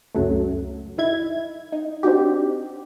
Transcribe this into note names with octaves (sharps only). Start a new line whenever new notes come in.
C#2 F#2 C#3 F#3 A3
D#4 E4 G#6
D#4
C4 D4 D#4 F#4 G4